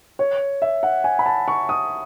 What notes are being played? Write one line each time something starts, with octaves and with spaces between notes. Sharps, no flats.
C#5
E5
F#5
G#5
B5
A5
C#6
D#6